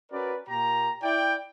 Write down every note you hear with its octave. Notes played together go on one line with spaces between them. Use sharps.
C#4 F#4 A#4 B4 D5
A#2 A#3 G4 A#5
E4 D5 G5